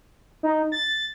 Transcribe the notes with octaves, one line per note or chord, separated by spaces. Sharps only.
D#4
A6